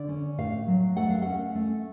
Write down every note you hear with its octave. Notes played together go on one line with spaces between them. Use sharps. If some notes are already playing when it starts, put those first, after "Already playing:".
Already playing: D3 D5
C#4
A2 F5
F#3
A3 F#5
F5
C#4 F#5
A3